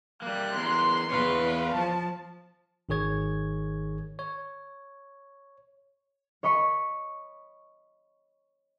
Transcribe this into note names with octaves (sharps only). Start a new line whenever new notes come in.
G3 A#3 F#6
E2 A#4 C6
E2 B4 C#5 F5
F3 A5
G#1 D#3 G#4 C#5 G#6
C#5
C#5 D#5 B5 C#6